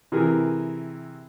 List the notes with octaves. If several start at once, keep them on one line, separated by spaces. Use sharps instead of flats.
C3 E3 G#4 A#4